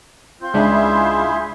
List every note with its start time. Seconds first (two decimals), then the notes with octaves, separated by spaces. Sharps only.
0.41 C4 F4 C6 G6
0.54 C#2 G#3 D4 E4 G#4 E5